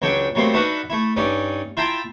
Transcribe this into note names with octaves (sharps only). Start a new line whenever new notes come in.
C#2 F#3 D4 C#5 G5
F#3 G3 A3 A#3 C4
D4 D#4 F#4 B4 E5 F#5
A3 E4
G2 C#4 D#4 D5
E4 F4 E5 G5 A5 A#5